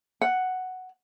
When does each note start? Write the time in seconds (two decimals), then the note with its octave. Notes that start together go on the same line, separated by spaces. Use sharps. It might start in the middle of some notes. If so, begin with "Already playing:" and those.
0.21 F#5